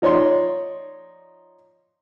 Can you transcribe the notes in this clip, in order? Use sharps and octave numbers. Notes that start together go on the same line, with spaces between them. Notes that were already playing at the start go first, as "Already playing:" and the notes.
F3 D#4 C#5 D5 C6